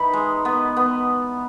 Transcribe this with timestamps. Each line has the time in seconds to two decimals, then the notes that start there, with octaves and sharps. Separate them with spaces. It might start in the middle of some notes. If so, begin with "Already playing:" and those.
Already playing: E3 D#4 B5
0.13 G#3
0.45 B3
0.77 B3